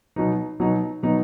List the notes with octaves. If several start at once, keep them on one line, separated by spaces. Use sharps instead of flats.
B2 F#3 B3 D#4
B2 F#3 B3 D#4
B2 F#3 B3 D#4